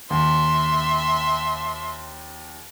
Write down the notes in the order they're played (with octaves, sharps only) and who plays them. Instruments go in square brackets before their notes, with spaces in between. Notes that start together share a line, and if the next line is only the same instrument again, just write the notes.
[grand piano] D#2 [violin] E5 C6